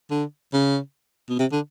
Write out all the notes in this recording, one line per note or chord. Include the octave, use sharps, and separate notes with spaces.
D3
C#3
B2
C3
D3